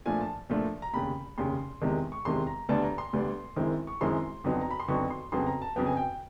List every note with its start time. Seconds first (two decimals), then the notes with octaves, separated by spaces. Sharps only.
0.06 A#2 F3 A3 D4 F4 G#5
0.21 A5
0.50 A#2 F3 A3 D4 F4
0.82 A#5
0.93 F1 D#2 C#3 B5
1.38 F1 D#2 C#3 C6
1.82 E2 C3 D#3 G#3
2.12 C#6
2.25 E2 C3 D#3 G#3 C6
2.47 A#5
2.69 D2 D3 G3 B3 D4 A5
2.83 A#5
2.98 C6
3.13 D2 D3 G3 B3 D4
3.56 F#2 D#3 G#3 C4 E4
3.87 C#6
4.01 F#2 D#3 G#3 C4 E4 C6
4.44 F2 D3 F#3 B3 D#4
4.61 A#5
4.71 B5
4.80 C6
4.88 F2 D3 F#3 B3 D#4 C#6
5.10 C6
5.32 F2 C#3 F#3 B3 C6
5.47 A#5
5.62 A5
5.76 F2 C#3 F#3 B3 G5
5.87 G#5
5.97 G5